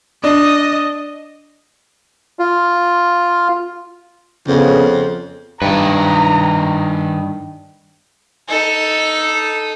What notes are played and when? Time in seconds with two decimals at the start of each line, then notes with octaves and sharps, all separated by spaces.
0.24 D4 D#5
2.39 F4
4.47 F2 C#3 B3
5.62 G2 D#3 B4 A#5
8.49 D#4 A4